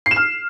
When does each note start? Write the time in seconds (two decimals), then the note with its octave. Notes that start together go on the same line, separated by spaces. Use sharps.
0.06 C7
0.11 E7
0.16 F6